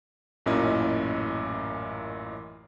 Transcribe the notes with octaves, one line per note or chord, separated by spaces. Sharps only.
A1 F#2 A#2 C#4 E4 D#5